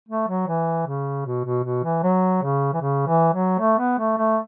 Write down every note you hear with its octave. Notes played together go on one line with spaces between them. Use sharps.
A3
F#3
E3
C#3
B2
B2
B2
E3
F#3
C#3
E3
C#3
E3
F#3
A3
B3
A3
A3